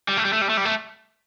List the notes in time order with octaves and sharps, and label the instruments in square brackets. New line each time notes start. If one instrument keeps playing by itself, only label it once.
[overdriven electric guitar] G3
A3
G3
A3
G3
A3
G3
A3